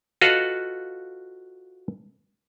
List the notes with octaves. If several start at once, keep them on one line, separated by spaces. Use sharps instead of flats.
F4 F#4 A4 B4 D#5 F5